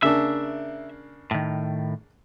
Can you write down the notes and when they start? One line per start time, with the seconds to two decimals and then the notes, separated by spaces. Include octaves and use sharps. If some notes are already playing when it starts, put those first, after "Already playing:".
0.03 C#3 A#3 D4 E5
1.31 A2 D#3